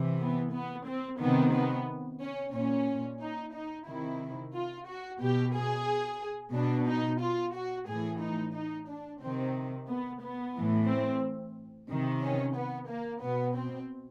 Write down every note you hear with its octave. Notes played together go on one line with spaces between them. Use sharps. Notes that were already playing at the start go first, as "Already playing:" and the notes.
Already playing: C3 E3
B3
B3
C4
C3 D#3 B3
B3
C#4
A#2 C#4
D#4
D#4
C3 D#3 E4
F4
F#4
B2 G4
G#4
B2 D4
D#4
F4
F#4
A2 E3 G#4
D#4
D#4
D4
C3 D#3 C4
B3
B3
A2 E3
C4
C3 D#3
C#4
B3
A#3
B2 B3
C4